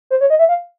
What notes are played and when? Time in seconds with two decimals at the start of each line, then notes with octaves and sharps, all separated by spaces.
0.10 C5
0.21 C#5
0.30 D#5
0.39 E5
0.49 F5